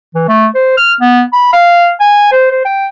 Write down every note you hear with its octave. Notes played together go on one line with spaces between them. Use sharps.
E3
A3
C5
F6
B3
B5
F5
G#5
C5
C5
G5